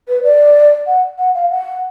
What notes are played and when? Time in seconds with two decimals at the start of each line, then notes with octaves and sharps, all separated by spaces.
0.08 B4
0.23 D5
0.87 F#5
1.18 F#5
1.35 F5
1.51 F#5